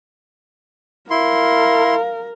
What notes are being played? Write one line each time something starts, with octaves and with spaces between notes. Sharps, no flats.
E4 A#4 F5 C6